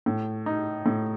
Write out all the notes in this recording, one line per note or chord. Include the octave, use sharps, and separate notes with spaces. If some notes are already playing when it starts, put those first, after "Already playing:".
A2
D#4
A2